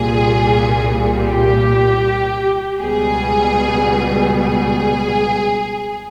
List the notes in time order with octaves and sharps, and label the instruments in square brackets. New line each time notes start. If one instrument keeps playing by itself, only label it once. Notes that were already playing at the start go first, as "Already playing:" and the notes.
Already playing: [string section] C2 A#2 G3 G#4
G4
C#2 B2 G3 G#4
G#4